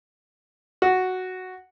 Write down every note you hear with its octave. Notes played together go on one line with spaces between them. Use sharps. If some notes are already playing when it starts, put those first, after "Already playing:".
F#4